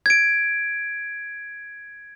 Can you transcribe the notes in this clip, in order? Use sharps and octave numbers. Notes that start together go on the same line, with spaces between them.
G#6 D7